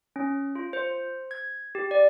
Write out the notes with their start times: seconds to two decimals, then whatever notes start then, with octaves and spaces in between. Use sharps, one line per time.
0.16 C#4
0.55 F4
0.73 C5
1.31 G#6
1.75 G4
1.91 D5